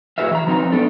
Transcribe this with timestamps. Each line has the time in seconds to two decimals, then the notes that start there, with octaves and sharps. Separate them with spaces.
0.18 A2 F#4 G#4 B4 E5 F5
0.31 E3 F5 A#5
0.47 F3 F#3 C4 D#4 B4 F5
0.72 A3 B3 D4 A4